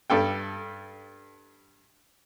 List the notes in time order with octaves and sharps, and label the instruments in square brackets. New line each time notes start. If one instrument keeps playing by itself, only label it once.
[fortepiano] G2 A4 G5